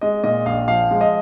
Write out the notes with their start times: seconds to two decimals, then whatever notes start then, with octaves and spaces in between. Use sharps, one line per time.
0.01 G#3 D#5
0.24 A#2 D#5
0.46 A#1 F5
0.68 F3 F5
0.91 G#3
1.01 D#5